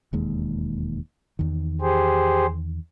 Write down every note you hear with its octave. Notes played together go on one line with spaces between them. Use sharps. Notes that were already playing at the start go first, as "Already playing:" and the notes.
E1 D#2 G#3
E2 D#3
G4 G#4 C5